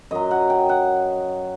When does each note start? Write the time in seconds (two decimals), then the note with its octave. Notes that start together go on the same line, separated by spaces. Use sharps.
0.11 F#2 F#3 D#5
0.31 F#5
0.50 G5
0.69 F#5